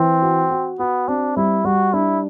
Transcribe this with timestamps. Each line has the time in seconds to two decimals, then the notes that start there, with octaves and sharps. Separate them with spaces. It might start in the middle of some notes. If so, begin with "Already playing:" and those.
Already playing: E3 C4
0.22 F#4
0.50 F#4
0.79 B3 F#4
1.08 C4 D4
1.37 G3 E4
1.65 G3 F#4
1.93 D4 E4